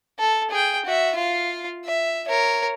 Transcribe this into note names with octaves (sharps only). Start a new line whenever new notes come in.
A4
G#4 G5
F#4 E5
F4 F5
E5
A#4 C#5